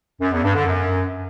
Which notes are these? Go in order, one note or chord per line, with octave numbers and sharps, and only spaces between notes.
F#2
E2
G2
D3
F#2